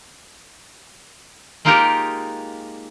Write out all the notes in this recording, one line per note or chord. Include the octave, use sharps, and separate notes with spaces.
G#3 A#3 D#4 F4 G4 A#4